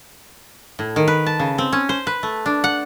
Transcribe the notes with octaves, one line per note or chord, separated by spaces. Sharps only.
A2
D#3
B4
A5
C#3
C4
C#4
C5
B4
A3
D4
F#5